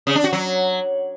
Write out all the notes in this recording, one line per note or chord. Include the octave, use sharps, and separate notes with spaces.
C#3
D4
F#4
F#3